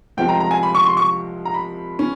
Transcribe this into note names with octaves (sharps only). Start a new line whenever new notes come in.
C2 C3 F3 G#3 G5
A#5
A#5
G#5
B5
C#6
C6
C#6
A#5
B5
C#4